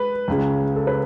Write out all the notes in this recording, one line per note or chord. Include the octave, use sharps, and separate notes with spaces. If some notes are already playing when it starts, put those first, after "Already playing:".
Already playing: G#3 B4
C#2 C#3 G#3
A4
B4